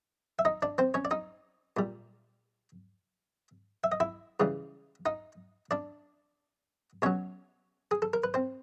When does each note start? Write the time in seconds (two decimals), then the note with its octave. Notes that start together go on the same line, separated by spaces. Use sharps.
0.39 E5
0.45 D#4 D#5
0.62 D4 D5
0.78 C4 C5
0.94 C#4 C#5
1.05 D5
1.11 D#4 D#5
1.77 A#2 G3
3.84 E5
3.92 D#5
4.00 E4 E5
4.40 C#3 E3 G3
5.06 D#4 D#5
5.71 D4 D5
7.02 B2 F#3 C#4 C#5
7.91 G#4
8.02 A4
8.13 A#4
8.24 B4
8.34 C4 C5